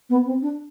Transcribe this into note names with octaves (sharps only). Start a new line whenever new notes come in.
B3
C4
D4